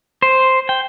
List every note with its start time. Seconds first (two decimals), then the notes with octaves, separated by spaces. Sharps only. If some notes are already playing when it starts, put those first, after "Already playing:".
0.22 C5
0.69 G5